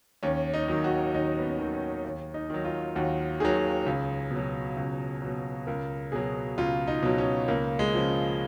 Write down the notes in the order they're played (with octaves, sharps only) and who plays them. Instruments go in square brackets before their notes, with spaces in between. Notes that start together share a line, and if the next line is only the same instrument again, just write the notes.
[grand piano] D#2 C#4
D#4
D#3 F#3
F#4
D#2 D#4
B3
C#4
D#3 F#3
C#4
D#2
D#4
D#3 F#3
F4
D#2 F#4
D#3 F#3 G#4
C#2
B2
F#3
C#2
B2 F#3
C#2 A#4
B2 F#3 G#4
C#2 F4
D#4
B2 F#3
C#4
C#2 A#3
G#3
C#3 F3
F4